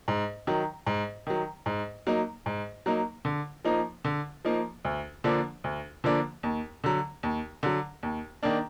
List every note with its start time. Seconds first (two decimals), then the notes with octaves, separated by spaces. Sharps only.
0.08 G#2
0.47 D#3 F#3
0.87 G#2
1.27 D#3 F#3
1.66 G#2
2.07 F#3 A#3 D#4
2.46 G#2
2.86 F#3 A#3 D#4
3.25 D3
3.65 F3 A#3 D#4
4.05 D3
4.45 F3 A#3 D#4
4.85 D2
5.24 D3 F3 A#3 D4
5.64 D2
6.04 D3 F3 A#3 D4
6.43 D#2
6.84 D3 F#3
7.23 D#2
7.63 D3 F#3
8.03 D#2
8.43 D#3 A#3 D4